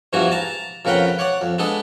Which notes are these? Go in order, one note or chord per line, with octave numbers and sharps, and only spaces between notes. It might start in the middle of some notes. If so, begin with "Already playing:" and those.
E2 G2 E3 F3 F#4 G#5
A5 A#5
F2 C#3 A#4 B4 F#5 G5
C#5 D5 F#5
F2
G#3 B3 D4 A4 D#6